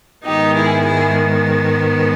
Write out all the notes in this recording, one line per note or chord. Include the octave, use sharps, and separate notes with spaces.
G#2 D#3 G#3 B3 D#4 G4
E4 G#4
E4 G#4